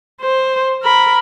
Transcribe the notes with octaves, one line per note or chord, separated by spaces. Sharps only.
C5
A#4 B5